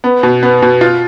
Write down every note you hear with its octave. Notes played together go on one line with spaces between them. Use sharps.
B3
B2
B3
B2
F4